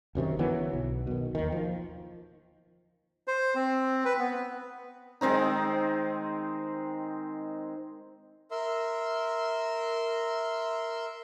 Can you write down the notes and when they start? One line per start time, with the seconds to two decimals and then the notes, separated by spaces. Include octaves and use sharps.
0.15 F#1 F#2 C3 D#3
0.39 D3 E3 F#3 B3
0.73 B1
1.07 B2 D#3
1.35 D#2 D#3
1.52 F3
3.28 C5
3.55 C4
4.05 B4
4.19 B3
5.21 D#3 G#3 C4 D#4
8.51 A#4 E5 C6